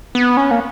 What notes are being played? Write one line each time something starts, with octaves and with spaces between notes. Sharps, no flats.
B3
C#4
A#3